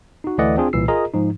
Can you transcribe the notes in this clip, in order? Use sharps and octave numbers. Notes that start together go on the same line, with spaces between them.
D#4 F#4
D2 E3 A3 D5 D#5 F#5
C4 D4 F4 G#4
C2 A#2 E3 E6 C7
F4 G#4 A#4 D#5 A#5
G#2 F3 D#4